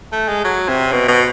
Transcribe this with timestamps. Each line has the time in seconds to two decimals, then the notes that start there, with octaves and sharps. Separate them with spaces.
0.12 A3
0.28 G#3
0.44 F#3
0.68 C3
0.92 B2
1.08 B2